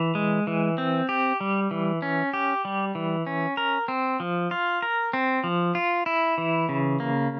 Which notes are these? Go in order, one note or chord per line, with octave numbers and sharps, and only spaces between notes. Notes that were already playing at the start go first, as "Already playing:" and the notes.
Already playing: E3
G#3
E3
C4
G4
G3
E3
C#4
G4
G3
E3
C#4
A#4
C4
F3
F4
A#4
C4
F3
F4
E4
E3
C#3
A#3